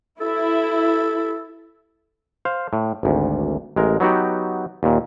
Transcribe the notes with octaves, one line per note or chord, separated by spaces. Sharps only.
E4 A4
C5 F5
A2
G#1 D2
A1 G#3 A#4
F#3 B3 D#4 F#4 G4
D#2 A#2